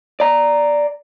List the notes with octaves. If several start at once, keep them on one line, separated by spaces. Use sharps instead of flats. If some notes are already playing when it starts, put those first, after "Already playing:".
D5 A#5